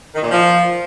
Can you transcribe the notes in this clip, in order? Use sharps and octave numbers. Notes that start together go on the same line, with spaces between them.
D#3
A#2
F3